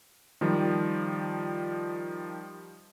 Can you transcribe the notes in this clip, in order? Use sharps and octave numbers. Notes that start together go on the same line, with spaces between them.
D#3 F3 G3